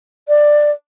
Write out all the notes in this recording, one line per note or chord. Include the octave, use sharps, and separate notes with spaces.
D5